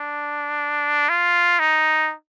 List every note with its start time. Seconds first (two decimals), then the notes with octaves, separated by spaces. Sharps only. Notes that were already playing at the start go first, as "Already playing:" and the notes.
Already playing: D4
1.09 F4
1.59 D#4